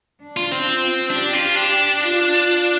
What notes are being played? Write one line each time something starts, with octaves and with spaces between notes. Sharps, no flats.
D4
F4
C4
F4
D4 G4
F4
D4
F4